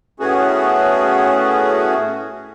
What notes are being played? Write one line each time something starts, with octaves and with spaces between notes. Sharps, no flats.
A2 A3 B3 C#4 F#4 G#4